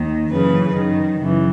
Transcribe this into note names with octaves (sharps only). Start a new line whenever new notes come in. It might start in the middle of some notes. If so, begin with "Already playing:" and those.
Already playing: D#2 D#3
F#2 C#3 E3 B4
F#2 D#3
F#2 C#3 E3